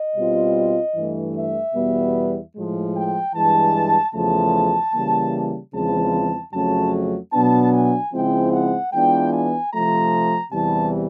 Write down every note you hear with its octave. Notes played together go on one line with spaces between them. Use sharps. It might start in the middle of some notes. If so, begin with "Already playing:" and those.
Already playing: D#5
B2 G3 C4 F4
G2 E3 A3
E5
E2 B2 G3 B3
A2 F3 G#3
G5
G2 E3 G#3 A5
E2 C#3 F3 A3 A5
C#3 E3 G3 A#3
E2 C#3 F3 G#3 C4 A5
F2 C#3 F#3 A3 C#4 A5
B2 F#3 B3 D4 A5
G#5
C#3 F3 G#3 C4 E4 G5
F#5
E3 G#3 B3 D4 F4 G5
G#5
C3 F3 A3 A#5
E2 C3 E3 G3 B3 A5